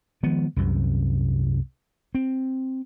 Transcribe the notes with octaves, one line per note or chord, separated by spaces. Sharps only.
D#3 F3 G#3 B3
C2 F#2 C3
C4